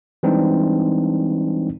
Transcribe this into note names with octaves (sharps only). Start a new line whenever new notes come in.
E3 G3 G#3 C4 D4 D#4